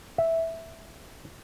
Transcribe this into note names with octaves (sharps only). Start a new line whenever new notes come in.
E5